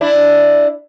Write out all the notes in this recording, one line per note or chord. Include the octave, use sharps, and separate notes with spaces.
D4 E4